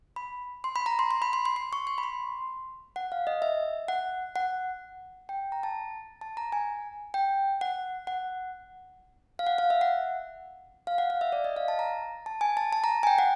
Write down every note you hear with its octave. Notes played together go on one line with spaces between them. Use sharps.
B5
C6
B5
A#5
C6
C6
B5
C6
C6
C6
C#6
C6
B5
C6
F#5
F5
D#5
E5
F#5
F#5
G5
A#5
A5
A5
A#5
G#5
G5
F#5
F#5
F5
F#5
F5
E5
F#5
F5
F#5
F5
E5
D5
D#5
F5
A5
A#5
A5
G#5
A5
A5
A#5
G#5
G5
F#5